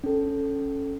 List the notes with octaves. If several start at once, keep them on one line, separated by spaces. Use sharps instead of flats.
C#4 A4